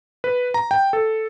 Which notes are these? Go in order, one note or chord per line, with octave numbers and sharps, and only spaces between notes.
B4
A#5
G5
A4